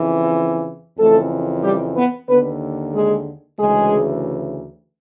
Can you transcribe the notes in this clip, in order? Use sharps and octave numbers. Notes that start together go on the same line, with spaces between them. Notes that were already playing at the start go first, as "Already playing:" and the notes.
Already playing: F2 C#3 E3
F2 C#3 E3 A3 A4
G3 G4
B3 B4
D#2 D3 B3 B4
G#3 G#4
D2 C#3 E3 G#3 G#4